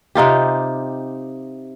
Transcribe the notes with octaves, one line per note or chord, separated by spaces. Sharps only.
C3 D#4 F4 G4